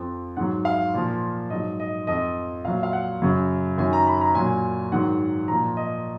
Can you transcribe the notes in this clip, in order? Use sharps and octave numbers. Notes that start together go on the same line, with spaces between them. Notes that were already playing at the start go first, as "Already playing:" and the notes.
Already playing: F2 F3
G#2 F#3 F#5
F5
A#2 F3
G#2 F#3 D#5
D#5
F2 F3 D#5
A#2 F#3 F5
F5
F#5
F#2 C#3 F#3
F#2 D#3 F#3 G#5
A#5
B5
A#5
A#2 F#3 G#5
G#2 D#3 F#3 F#5
A#2 F3 A#5
D#5